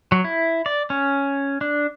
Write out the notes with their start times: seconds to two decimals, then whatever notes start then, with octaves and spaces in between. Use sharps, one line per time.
0.12 F#3
0.24 E4
0.66 D5
0.90 C#4
1.61 D4